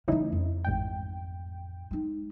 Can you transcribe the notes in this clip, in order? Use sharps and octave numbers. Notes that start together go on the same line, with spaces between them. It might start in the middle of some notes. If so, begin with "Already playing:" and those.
C#3 E3 A3 D#4 E4
F2
A1 G#2 G5
G#3 D#4